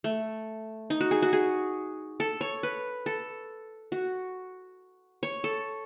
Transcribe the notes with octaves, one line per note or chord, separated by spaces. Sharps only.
A3
D#4
F#4
G#4
F#4
G#4
A4
C#5
B4
A4
F#4
C#5
A4